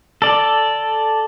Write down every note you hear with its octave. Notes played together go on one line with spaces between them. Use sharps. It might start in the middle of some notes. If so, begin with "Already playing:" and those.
A4 D5